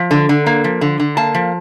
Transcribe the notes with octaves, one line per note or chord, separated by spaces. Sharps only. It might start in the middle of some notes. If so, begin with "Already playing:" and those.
Already playing: F3
D3
D3
A#3
F3
D3
D3
A#3 A5
F3